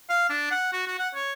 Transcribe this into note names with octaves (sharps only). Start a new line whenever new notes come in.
F5
D4
F#5
F#4
F#4
F#5
C#5